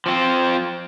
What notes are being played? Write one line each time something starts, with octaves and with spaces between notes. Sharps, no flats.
F3 C4